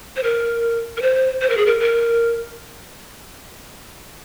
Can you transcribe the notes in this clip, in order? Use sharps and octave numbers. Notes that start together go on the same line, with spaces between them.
C5
A#4
A#4
C5
C5
A#4
G#4
A#4
A#4